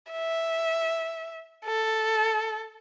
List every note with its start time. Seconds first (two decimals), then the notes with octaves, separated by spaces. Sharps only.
0.12 E5
1.65 A4